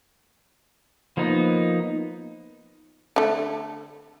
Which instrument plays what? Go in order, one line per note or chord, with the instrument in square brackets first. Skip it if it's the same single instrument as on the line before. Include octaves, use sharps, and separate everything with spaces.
[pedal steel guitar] F3 A#3 B3 D#4
[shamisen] D3 A3